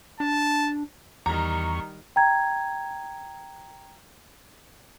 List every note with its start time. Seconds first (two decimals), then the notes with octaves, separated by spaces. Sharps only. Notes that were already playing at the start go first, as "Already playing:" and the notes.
0.20 D4 A5
1.26 E2 D#3 G3 A#5 C#6
2.16 G5 A#5 G#6